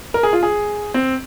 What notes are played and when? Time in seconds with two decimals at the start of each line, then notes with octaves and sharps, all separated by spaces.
0.14 A#4
0.23 G#4
0.33 F4
0.43 G#4
0.94 C4